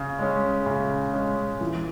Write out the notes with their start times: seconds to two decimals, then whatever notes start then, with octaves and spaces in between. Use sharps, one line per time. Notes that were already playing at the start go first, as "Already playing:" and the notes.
Already playing: C#3
0.19 G#3 C#4
0.66 C#3
1.14 G#3 C#4
1.61 E3